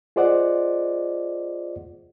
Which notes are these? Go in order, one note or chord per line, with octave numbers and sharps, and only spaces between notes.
F4 G#4 C5 D5 D#5 F#5